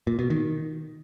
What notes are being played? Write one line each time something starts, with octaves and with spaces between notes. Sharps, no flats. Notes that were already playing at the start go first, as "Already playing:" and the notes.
A#2
B2
D#3